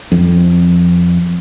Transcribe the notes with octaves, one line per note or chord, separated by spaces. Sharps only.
F2